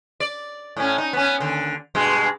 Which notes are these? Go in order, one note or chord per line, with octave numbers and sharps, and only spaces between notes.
D5
A2 C#4
D#4
B3 C#4
D#2 D3
G2 B2 G#3